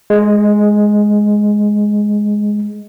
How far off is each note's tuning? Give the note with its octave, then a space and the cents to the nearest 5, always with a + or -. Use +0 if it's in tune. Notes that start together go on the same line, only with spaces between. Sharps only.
G#3 +5